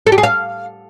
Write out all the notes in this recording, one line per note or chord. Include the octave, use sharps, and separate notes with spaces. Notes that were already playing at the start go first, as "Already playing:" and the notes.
A4
G4
G#4
F5